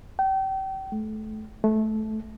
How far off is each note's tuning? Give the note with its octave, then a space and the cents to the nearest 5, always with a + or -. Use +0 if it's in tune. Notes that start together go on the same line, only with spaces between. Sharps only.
G5 -30
A3 -25
A3 -15